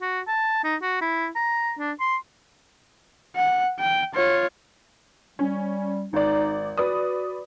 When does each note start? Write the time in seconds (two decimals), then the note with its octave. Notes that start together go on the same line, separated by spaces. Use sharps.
0.01 F#4
0.27 A5
0.64 D#4
0.82 F#4
1.01 E4
1.35 A#5
1.78 D4
2.00 C6
3.36 F#5
3.79 G5
4.14 F4 C#5
5.39 G3 C#4
6.13 G#1 D#4 D5
6.78 F#4 B4 D5 D#6